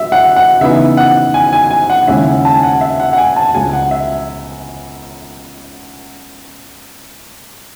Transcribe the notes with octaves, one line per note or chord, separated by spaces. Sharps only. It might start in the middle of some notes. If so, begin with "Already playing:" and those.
Already playing: E5
F#5
F#5
C#3 E3 B3 D#4 E5
F#5
G#5
G#5
G#5
F#5
D#2 C#3 G#3 C#4 E4 E5
F#5
A5
G#5
F#5
E5
F#5
F#5
G#5
A5
C#2 C#3 G#3 G#5
F#5
E5